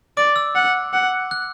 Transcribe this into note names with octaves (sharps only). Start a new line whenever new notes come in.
D5 D6
E6
F#5
F#5
F#6